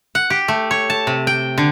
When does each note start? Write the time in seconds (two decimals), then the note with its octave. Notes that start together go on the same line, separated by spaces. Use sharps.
0.15 F#5
0.30 G4
0.48 A3
0.71 C#5
0.90 A5
1.07 C3
1.27 G5
1.58 D3